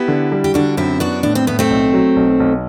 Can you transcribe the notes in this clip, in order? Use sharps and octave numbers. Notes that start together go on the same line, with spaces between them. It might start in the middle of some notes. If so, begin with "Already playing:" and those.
Already playing: B3 E4 G4
D3
G3
G4
D3 D4 F#4
F#2 C4 E4
B3 D4 F#4
A2 D4
C4
A2 B3
A3 C4
B1
F#3
B1
B1